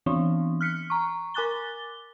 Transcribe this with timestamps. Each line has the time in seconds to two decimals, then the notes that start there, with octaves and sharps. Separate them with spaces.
0.06 E3 B3 C4 D4
0.61 F6 F#6 B6 C#7
0.90 A#5 C#6
1.34 A#4 G#5 D6 F#6 A6 G7